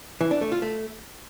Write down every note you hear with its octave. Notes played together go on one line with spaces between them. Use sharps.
E3
D4
A3
F4
A3